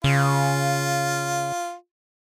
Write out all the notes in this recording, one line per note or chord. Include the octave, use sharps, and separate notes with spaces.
C#3 F4